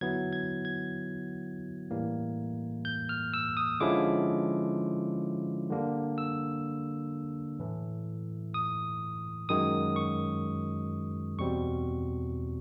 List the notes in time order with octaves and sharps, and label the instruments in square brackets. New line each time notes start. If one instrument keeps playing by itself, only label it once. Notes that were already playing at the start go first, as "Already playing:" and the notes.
[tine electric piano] D3 F#3 B3 E4 G#6
G#6
G#6
A2 E3 G3 A#3
G6
F6
E6
D#6
D3 F3 G#3 C#4 E4 D6
D3 G3 A#3 D4
E6
A2 E3 A3
D#6
F#2 D#3 G#3 D#6
C#6
E2 B2 G3 C4 C#6